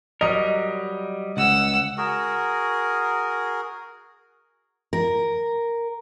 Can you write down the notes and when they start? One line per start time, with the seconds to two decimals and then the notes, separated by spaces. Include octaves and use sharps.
0.21 F#3 G3 A#4 D#5
1.37 C#2 F#5 E6
1.98 F#4 G#4 A#4
4.93 A#4